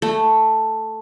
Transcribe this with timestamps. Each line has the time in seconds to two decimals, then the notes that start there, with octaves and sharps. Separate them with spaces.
0.02 A3